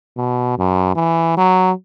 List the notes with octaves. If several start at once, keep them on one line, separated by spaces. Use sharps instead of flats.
B2
F#2
E3
F#3